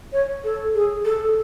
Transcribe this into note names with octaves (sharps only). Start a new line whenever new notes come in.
C#5
A4
G#4
A4